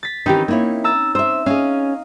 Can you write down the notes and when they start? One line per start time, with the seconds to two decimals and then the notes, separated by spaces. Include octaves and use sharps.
0.03 A6 B6
0.26 D#3 E3 C4 C#4 D#4 G4
0.48 A#3 E4 C#5
0.84 A#5 E6 A6
1.15 C5 E5 E6
1.46 C#4 G#4 D#5 F5